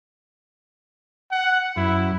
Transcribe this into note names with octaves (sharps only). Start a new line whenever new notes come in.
F#5
F#2 E4